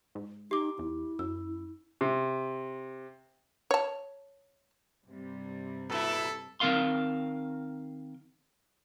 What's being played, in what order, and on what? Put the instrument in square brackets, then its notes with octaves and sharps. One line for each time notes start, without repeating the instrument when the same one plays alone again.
[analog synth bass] G#2
[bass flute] D#4 [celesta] G4 D6
[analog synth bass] E2 [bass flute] E4
[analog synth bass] F#2 [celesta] E6
[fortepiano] C3
[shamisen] C#5 A5
[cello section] G2 C3 G3
[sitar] A#2 E4 [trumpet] A4
[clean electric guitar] D#3 C4 A#4 F5 C6